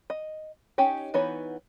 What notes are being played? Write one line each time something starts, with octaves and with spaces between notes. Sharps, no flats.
D#5
C#4 D#4 G4 C#5
E3 B3 D#4 F#4 C#5